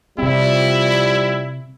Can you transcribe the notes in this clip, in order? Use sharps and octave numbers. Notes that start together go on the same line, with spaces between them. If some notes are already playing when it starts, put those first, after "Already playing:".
C3 F3 G3 C4 E4